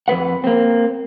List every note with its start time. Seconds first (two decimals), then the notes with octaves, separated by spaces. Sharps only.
0.08 F2 G#2 B4 F#5
0.44 A#3 C4